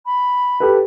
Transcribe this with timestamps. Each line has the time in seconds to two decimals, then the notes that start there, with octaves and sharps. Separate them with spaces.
0.05 B5
0.60 G4 A4 B4